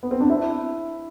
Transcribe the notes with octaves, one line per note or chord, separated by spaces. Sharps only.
B3
C4
D4
E4